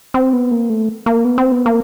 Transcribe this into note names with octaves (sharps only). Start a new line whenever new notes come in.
C4
B3
A#3
A3
A#3
B3
C4
B3
A#3